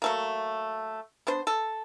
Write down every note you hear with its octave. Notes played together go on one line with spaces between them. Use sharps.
F#3 A3 A#3
B3 D4 C5
A4